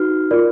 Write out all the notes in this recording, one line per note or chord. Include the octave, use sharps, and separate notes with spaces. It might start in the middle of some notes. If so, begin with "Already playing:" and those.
Already playing: D#4 F#4 B4 F6
F4 A#4 D5